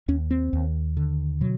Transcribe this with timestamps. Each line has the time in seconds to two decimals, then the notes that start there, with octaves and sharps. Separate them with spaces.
0.08 D#2 C#4
0.31 C4
0.53 D#2
0.97 D3
1.41 B2 F#3